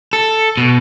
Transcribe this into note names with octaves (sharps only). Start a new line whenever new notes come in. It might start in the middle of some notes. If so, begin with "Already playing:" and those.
A4
B2